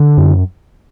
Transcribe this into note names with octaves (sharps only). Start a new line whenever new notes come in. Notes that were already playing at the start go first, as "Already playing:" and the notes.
Already playing: D3
F#2